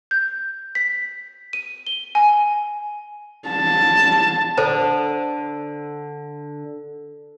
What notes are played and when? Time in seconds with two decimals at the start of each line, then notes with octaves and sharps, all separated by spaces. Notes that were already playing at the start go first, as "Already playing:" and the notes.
0.11 G6
0.75 B6
1.53 D#7
1.87 G7
2.15 G#5
3.48 A5
4.57 D3 A4 C5 A5